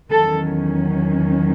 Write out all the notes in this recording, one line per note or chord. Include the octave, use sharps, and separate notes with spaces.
E2 D#3 F#3 C#4 A4